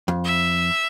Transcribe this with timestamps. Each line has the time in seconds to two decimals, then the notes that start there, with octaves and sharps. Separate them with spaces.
0.08 F2
0.24 E5